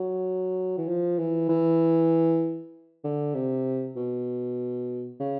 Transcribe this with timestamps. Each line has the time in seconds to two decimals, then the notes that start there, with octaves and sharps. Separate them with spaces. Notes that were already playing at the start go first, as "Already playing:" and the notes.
Already playing: F#3
0.78 E3
0.88 F3
1.18 E3
1.49 E3
3.04 D3
3.34 C3
3.96 B2
5.20 C#3